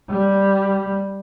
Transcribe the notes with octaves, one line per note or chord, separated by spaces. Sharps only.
G3